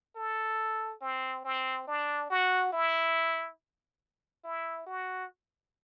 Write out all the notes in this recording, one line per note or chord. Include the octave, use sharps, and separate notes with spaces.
A4
C4
C4
D4
F#4
E4
E4
F#4